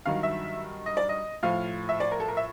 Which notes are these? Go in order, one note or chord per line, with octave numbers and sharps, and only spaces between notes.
G2 D#3 F#3 F5
E5
D#5
D5
D#5
A2 F3 F5
E5
D5
A#4
A4
A#4
E5